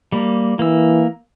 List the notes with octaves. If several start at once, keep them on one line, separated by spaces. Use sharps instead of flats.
G3 A#3
E3 A#3 E6